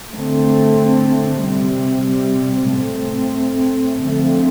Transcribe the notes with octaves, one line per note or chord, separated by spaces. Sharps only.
D3 A3 C4
C3 G3 C4
A2 A3 C4
D3 F3 A3 C4